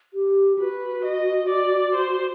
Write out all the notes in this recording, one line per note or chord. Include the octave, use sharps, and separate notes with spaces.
G4
F#4 B4
D#5
D5
C5